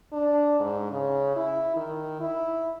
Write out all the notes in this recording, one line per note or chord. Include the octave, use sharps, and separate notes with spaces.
D4
G#2
C#3
E4
D#3
E4